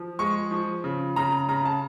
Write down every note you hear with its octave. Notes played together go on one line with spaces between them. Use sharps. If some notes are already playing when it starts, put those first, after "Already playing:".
Already playing: F3
G#3 C#6
F3
C#3
C#3 A#5
C#3 A#5
A5